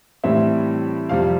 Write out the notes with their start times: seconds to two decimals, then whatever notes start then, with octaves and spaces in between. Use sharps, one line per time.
0.24 A2 E3 G3 C4 E5
1.09 F2 C3 G3 F5